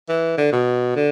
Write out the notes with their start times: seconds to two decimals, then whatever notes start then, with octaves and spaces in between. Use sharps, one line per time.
0.09 E3
0.38 D3
0.53 B2
0.96 D3